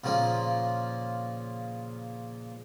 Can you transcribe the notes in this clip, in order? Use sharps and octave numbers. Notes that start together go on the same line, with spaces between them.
A#2 C#3 F3 A#3